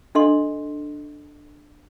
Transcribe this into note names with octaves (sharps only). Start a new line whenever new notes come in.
D4 A4 D#5 C6